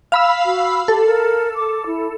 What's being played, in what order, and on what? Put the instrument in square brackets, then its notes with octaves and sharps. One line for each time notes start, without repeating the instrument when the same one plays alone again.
[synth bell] F5 B5 E6
[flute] F#4
[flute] G4 [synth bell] A4
[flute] A#4
D6
E4